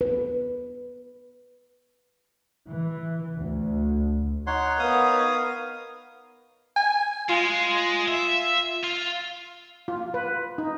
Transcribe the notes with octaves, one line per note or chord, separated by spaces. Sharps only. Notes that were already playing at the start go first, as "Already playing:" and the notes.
B4
E3
D2
D#4 C#5 F#5 C6
B3 A#4 F5 D#6
G#5
G#3 F4
E5
F4
F4
B4
D#4